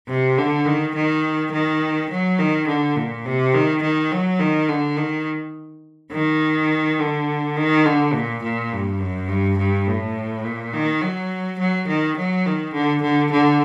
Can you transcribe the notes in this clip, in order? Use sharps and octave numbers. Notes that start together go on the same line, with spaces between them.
C3
D3
D#3
D#3
D#3
F#3
D#3
D3
A#2
C3
D#3
D#3
F#3
D#3
D3
D#3
D#3
D3
D#3
D3
A#2
A#2
G2
F#2
G2
G2
A2
A#2
D#3
F#3
F#3
D#3
F#3
D#3
D3
D3
D3